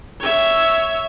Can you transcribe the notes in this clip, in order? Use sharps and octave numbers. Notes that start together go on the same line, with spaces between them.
C#5 E5